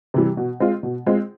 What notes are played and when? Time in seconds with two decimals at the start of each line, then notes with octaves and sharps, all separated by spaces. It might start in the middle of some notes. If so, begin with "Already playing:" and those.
0.14 C3 E3 G3
0.37 B2
0.60 G#3 C4 F4
0.83 B2
1.06 G#3 C4 F4